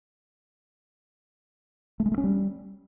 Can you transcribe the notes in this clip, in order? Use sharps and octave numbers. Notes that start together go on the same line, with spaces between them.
A3
G#3
A3
C#4
G3